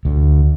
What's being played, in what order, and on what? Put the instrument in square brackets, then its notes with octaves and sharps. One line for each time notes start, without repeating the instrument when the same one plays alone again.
[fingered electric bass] D2